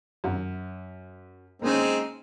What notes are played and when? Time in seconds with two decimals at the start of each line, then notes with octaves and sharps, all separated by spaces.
0.24 F#2
1.62 G#3 A#3 C4 C#4 D#4